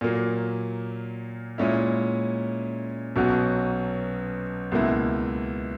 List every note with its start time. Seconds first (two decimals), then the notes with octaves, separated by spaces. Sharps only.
0.01 A#2 F#3 A#3
1.58 A#2 G#3 C#4 E4
3.16 B1 B2 F#3 C#4 F#4
4.72 C#2 B2 A#3 E4